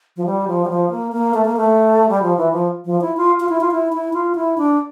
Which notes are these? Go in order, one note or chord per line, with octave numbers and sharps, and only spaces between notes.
F3
G3
F3
G3
F3
A#3
A#3
A3
A#3
A3
G3
F3
E3
F3
F3
E4
F4
F4
E4
F4
E4
E4
F4
E4
D4